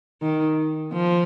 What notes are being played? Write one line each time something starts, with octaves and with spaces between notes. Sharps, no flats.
D#3
F3